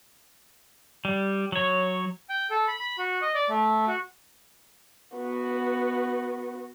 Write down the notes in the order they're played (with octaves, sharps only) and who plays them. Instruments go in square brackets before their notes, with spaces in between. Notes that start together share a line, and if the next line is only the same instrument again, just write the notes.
[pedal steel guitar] G3
F#3 C#5
[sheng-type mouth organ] G5
A4
B5
B5
F#4
D#5
D5
A3
F#4
[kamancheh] B3 F#4